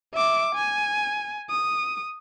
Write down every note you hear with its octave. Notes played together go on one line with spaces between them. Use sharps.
E5 D6
G#5
D#6